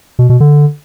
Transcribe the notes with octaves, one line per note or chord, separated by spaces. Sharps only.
B2
B2
D3